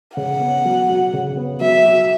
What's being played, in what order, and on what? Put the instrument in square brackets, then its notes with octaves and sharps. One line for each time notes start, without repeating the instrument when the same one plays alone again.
[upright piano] C#3 [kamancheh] F#5
[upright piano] B3
F#3
F#4
C#3
B3
[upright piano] F#3 [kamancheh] E5
[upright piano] F#4